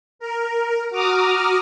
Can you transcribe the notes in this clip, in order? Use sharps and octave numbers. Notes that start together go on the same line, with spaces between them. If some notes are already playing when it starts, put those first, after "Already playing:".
A#4
F#4 A#5 D6 D#6 F6